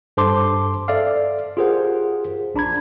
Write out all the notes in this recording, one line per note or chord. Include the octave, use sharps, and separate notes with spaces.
G2 A4 C5 A5 C6 D6
A4 D5 E5 F5
F4 G4 G#4 A#4 C5 F#5
A#1 D4 A#5 B5 G#6